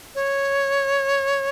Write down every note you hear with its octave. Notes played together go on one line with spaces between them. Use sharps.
C#5